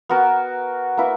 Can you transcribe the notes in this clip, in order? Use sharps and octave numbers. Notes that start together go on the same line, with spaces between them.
B3 F#4 A#4
A#3 E4 B4 E5